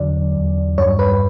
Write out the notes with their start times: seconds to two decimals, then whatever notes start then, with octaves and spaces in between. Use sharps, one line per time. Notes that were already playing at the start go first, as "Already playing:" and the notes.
Already playing: E2 D3 F#3 D5
0.36 E2
0.78 G2 C#5
0.99 B4